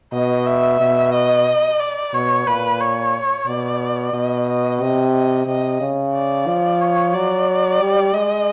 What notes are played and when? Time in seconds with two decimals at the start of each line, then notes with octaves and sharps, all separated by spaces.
0.13 B2 D#5
0.47 E5
0.81 B2
1.14 D#5
1.80 D5
2.13 B2 C#5
2.47 A#2 B4
2.81 C#5
3.47 B2 D5
4.13 B2 D#5
4.48 D#5
4.80 C3 D#5
5.14 D#5
5.47 C3 D#5
5.81 C#3
6.15 D5
6.47 F3
6.81 C#5
7.14 F#3 D5
7.81 G3
8.14 G#3 D#5